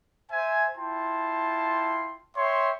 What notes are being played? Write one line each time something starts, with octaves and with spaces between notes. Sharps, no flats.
C5 E5 G#5
E4 F4 G5 A5 C6
C#5 E5 G5 C6